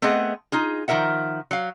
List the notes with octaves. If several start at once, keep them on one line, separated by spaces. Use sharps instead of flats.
A3 B3 C4 G#4 D#5 F#5
D#4 F4 G#4
D#3 F3 A#4 E5 F#5
F#3 F5